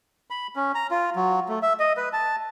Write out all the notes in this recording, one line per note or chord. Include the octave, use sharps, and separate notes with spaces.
B5
C#4
A#5
F4
F#3
A3
E5
D#5
B4
A5